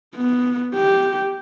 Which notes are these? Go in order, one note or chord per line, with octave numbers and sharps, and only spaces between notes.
B3
G4